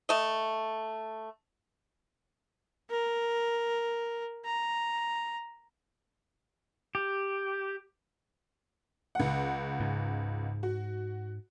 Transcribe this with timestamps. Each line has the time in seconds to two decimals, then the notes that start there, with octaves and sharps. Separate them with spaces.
0.09 A3 D#5
2.90 A#4
4.45 A#5
6.95 G4
9.15 C#2 F#5
9.80 G#2
10.63 F#4